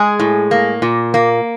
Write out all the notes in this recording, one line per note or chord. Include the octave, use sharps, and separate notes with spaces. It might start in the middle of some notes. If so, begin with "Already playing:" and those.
Already playing: G#3 G#4
A2
A#3
A#2
A#3